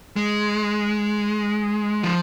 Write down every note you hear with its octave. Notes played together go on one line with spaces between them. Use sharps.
G#3
F3